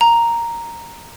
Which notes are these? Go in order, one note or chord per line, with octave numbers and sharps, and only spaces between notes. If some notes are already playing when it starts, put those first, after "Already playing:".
A#5